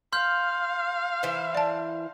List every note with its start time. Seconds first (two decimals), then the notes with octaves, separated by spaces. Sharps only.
0.13 F5 C6 F6 G6
1.23 E3 C5 E5
1.55 D5 A5